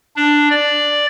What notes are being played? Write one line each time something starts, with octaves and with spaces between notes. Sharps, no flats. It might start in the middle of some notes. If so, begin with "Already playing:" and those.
D4
D5